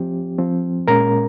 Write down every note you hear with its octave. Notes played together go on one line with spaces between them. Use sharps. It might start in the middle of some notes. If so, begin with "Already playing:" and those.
Already playing: F3 C4 G4
F3 C4
A#2 G#3 C#4 A#4 A#5